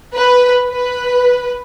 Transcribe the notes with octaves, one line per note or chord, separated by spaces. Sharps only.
B4
B4